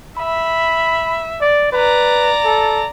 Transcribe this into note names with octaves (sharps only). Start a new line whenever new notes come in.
E5 B5
D5
B4 D5 A#5
A4